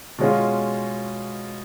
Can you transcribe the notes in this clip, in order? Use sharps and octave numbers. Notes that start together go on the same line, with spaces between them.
B2 G#3 C#4 F4